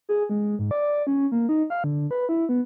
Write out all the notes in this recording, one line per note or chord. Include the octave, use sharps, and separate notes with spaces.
G#4
G#3
G#2
D5
C#4
A#3
D#4
F5
D3
B4
E4
B3